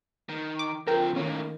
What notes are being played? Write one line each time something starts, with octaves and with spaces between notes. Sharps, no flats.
D#3
D6
D3 C4 F4 A#4 G5
A2 D#3 A#3 C#4